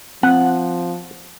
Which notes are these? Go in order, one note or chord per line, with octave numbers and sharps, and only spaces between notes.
F3 C4 F#5